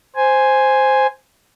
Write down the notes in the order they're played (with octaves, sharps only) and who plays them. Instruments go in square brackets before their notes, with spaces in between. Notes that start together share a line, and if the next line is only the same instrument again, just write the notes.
[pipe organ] C5 G#5